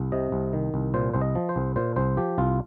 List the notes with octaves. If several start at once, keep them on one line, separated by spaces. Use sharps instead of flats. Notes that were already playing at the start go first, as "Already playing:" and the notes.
Already playing: C2
C3 D#5
C2
D#3
C2
A#2 C5
C2 C5
D#5
F3
C5
C2
A#2 C5
C2 C5
F3 G4
C2 F4